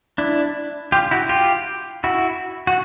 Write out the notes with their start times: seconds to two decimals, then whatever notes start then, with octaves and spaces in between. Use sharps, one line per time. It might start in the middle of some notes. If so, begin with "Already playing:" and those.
0.18 D4 E4
0.92 F4 G4
1.11 E4 F#4
1.29 F4 G4
2.04 E4 F#4
2.67 F#4